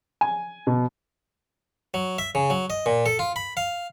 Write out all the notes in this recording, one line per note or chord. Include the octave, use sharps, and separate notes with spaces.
G#5
B2
F#3
E5
C#3
F#3
D#5
A#2
A4
F4
B5
F5